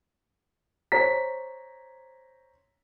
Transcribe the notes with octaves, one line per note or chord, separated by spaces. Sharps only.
C5 C#5 A#5 B6